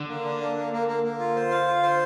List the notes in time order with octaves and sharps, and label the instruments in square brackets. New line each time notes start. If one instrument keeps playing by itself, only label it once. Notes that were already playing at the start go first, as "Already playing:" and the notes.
Already playing: [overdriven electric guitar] D3
[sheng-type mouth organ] A#3
D4
A#3
A#3
A#3
A#3
A#3
F4
C5
F5
F4
C5